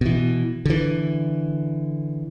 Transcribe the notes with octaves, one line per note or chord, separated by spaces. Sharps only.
B2 E3
D3 E3